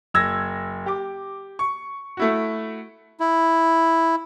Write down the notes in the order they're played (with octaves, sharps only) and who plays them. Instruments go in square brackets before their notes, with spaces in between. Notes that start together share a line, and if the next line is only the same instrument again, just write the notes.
[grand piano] F#1 E6 G#6 A#6
G4 D6
C#6
A3 E4 F#4
[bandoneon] E4